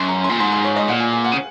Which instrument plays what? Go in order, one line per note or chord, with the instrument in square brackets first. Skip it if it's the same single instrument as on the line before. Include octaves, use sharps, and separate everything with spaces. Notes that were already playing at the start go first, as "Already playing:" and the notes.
Already playing: [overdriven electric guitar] F#2 [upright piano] C6
[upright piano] A#5
C6
[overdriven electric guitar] A#2
[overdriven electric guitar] G#2 [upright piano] C6
[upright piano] C6
C#5
D#5
[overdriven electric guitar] A#2 [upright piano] F#5
[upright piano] G#5
G#5
F#5
[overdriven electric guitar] C#3